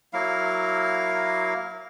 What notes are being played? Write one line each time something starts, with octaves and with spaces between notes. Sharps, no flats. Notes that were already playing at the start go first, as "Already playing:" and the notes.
F#3 A#3 E4 F5